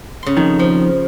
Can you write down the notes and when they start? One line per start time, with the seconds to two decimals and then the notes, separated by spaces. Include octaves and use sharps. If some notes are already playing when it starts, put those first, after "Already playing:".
0.23 C#3 C6
0.37 F2 D#3
0.59 F3